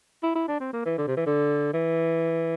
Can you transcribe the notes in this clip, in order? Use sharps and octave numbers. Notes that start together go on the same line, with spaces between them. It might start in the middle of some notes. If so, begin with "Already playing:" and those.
E4
E4
D4
C4
A#3
E3
D3
C3
E3
D3
E3